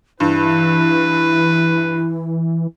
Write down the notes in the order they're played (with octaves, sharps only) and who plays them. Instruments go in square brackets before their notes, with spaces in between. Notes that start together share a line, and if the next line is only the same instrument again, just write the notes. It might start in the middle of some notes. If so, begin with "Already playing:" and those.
[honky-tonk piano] G2 [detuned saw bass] E3 [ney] E4 [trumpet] B4